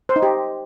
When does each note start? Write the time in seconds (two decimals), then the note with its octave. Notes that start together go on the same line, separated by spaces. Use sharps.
0.09 C5
0.16 D#4
0.23 G4